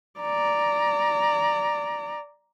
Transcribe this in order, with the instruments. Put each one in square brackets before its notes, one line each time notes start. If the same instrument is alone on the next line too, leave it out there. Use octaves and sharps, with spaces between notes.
[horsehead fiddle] D5 A#5